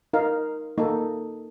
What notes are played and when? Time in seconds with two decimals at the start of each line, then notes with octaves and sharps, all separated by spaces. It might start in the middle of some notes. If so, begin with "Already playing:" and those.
0.13 D#4 A#4 F5
0.78 A#3 D#4 A4